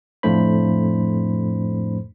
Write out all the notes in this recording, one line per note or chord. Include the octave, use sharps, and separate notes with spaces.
F2 A2 A3 D4 C5 B5